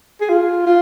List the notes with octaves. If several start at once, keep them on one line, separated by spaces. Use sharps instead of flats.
G#4
F4
F4